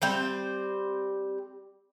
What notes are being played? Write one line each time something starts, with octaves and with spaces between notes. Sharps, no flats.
G3 C4 C5